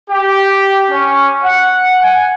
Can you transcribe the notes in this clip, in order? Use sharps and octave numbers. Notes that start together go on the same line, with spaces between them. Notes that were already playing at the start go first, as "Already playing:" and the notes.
G4
C#4
F#5
G#5